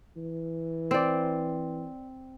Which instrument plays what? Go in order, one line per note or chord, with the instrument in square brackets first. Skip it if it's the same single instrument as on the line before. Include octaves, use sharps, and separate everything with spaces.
[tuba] E3
[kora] C4 D5